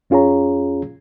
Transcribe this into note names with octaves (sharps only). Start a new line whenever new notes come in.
F2 C#4 F4 G#4 C#5 A#5